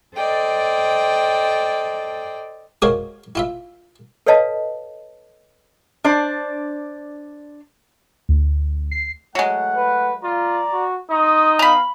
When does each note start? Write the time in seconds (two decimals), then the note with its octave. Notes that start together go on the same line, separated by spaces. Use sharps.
0.16 A4 C5 D5 D#5 G5
2.82 G#3 A#3 F#4 A#4 C5 C#5
3.35 E4 F4 E5
4.26 A4 B4 C#5 D#5 F5 A5
6.04 D4 C5 D5
8.29 D2
8.91 C7
9.35 F#3 G#3 A3 F#5
9.76 B4
10.23 F4 D5 A#5
10.73 F#4
11.10 D#4 C6 D#6
11.59 B3 F5 A#5 B5